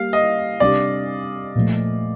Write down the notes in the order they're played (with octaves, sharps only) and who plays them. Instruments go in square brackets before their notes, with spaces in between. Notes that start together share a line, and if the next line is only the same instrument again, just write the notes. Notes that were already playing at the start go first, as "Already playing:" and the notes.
Already playing: [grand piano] G3 A#3 G4 [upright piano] F5
[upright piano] D#5
[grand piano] C3 G3 D4 G4 [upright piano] D5
[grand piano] A#2 F3 A3